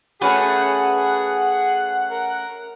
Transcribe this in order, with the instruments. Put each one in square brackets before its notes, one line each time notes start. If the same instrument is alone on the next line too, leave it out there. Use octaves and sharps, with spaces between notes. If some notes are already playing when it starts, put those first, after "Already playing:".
[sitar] A3 C#4 F#4 [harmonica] G#4 [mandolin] B4 [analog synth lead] F#5
[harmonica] A#4